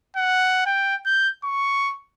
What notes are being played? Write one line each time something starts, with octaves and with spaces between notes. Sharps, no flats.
F#5
G5
G6
C#6